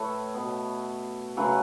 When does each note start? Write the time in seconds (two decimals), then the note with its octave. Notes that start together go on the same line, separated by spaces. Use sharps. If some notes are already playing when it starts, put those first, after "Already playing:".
Already playing: A2 A3 A4 B4 C#5 E5
0.34 B2 B3
1.37 C#3 F#3 A3 B4